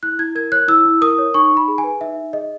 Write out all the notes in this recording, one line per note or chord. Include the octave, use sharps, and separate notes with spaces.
E4 F#6
E4 G#6
A#4 G#6
C#5 F#6
E4 E6
E4
A#4 D#6
C#5
D#4 C#6
D#4
B5
G#4
G#5
B4
D#4 E5
D#4
G#4 D#5